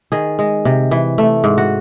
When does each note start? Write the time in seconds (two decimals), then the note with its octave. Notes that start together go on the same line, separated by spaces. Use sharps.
0.12 D#3 G#4
0.39 G#3
0.65 C3
0.91 E3
1.18 A3
1.44 G#2
1.58 F#4